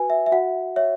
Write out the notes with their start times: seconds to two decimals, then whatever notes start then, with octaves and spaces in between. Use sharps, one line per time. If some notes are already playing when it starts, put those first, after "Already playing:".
Already playing: F#4 B4 G#5
0.10 E5
0.26 E5
0.32 F#4 F#5
0.76 C#5 E5